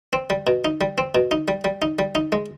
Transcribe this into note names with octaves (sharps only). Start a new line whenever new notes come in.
C4
G3
B2
D#4
G3
C4
B2
D#4
G3
G3
D#4
G3
D#4
G#3